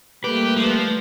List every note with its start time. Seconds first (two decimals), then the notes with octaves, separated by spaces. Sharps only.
0.24 G3 A3 A#3 G4 B4
0.56 F3